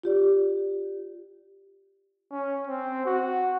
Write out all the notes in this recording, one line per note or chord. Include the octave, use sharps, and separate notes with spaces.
F4 G4 D5
C#4
C4
F#4